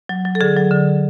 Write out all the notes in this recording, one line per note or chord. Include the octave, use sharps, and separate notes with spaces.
F#3
F#3
A4
D3 G#4
F#3
D3